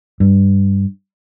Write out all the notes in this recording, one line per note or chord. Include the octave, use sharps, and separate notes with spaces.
G2